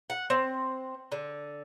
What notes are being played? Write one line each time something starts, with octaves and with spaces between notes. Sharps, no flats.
F#5
C4
D3